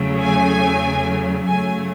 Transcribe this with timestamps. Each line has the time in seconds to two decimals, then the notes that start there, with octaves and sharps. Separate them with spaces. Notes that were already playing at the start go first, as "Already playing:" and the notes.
Already playing: E2 C#3 F#3 A3
0.21 G#5
1.47 F#2 C#3 F#3 A3 G#5